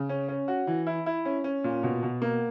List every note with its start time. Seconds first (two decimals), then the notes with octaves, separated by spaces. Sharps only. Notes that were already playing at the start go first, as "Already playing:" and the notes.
Already playing: C#3
0.09 C#4
0.28 C#4
0.48 F#4
0.67 E3
0.87 E4
1.06 E4
1.25 C#4
1.44 C#4
1.64 A#2
1.83 B2
2.03 B2
2.22 A#3